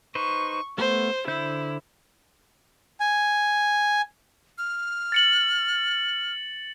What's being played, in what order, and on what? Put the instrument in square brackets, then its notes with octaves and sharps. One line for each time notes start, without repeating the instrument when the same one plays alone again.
[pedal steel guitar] D#4 B4 C5 [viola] C#6
[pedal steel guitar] A3 B3 [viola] C5
[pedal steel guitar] D3 C5 G6 [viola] E4
[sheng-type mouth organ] G#5
[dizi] F6
[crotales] A6 C#7 F#7